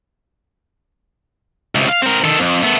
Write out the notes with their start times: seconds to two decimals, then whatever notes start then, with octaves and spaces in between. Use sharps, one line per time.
1.75 C#2 C3
1.89 F5
2.02 C4 A#4
2.24 D#3 A4
2.39 F2
2.63 A3 B3